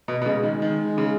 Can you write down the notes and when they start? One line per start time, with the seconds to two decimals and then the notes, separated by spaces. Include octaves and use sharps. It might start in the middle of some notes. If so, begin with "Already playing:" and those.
0.08 B2
0.22 B2
0.26 C#3 G#3
0.43 D#3
0.62 D#3
0.98 C#3